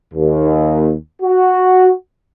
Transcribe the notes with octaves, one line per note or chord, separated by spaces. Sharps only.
D#2
F#4